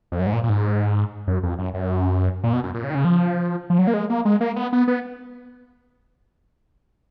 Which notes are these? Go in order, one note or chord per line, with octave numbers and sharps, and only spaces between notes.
F2
F#2
G#2
A#2
A#2
G#2
F#2
F2
F#2
F#2
A#2
B2
F#2
A#2
C#3
D#3
C#3
F3
F3
F#3
A#3
G#3
A#3
G#3
A#3
B3
B3
B3